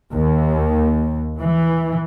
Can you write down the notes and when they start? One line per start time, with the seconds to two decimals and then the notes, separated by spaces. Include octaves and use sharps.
0.13 D#2
1.41 E3